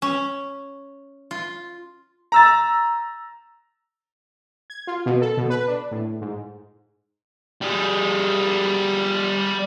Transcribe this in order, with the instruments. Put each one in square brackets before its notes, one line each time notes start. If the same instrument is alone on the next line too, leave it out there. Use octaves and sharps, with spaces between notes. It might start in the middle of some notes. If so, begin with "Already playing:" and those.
[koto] C#4
F4
[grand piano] A#5 E6 A6
[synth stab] G#6
F4
B2
A4
B2
B4
D4
A2
G#2
[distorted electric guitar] G3 G#4